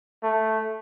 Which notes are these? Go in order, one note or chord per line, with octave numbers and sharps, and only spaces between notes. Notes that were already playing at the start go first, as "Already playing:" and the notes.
A3